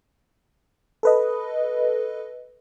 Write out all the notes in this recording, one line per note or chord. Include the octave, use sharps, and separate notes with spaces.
A4 B4 D#5